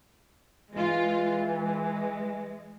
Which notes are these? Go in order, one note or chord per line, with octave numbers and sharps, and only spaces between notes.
E3 G#3 F4
G#3